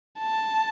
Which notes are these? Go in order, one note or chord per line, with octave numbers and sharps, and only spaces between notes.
A5